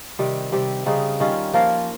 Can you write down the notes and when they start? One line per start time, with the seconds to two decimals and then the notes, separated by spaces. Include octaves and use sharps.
0.19 C3 D#3 G3
0.52 C3 G3 C4 G4
0.86 C#3 G3 C4 D#4
1.20 D#3 G3 C#4 F4
1.54 F3 A#3 F4 A#4